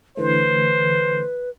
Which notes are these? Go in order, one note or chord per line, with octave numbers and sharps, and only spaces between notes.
D3 E3 A3 B4 C5